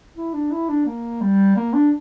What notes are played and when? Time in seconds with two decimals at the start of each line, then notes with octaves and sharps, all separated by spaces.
0.16 E4
0.34 D4
0.51 E4
0.69 D4
0.86 A#3
1.21 G3
1.56 A#3
1.74 D4